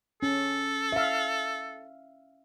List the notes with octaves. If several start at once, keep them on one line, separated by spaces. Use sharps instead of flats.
C#4 A4
E5 F5